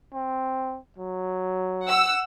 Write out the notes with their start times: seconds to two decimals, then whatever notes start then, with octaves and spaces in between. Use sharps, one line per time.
0.14 C4
0.98 F#3
1.83 F#5 E6